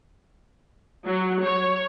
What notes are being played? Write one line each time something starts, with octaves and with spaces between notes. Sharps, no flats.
F#3
C#5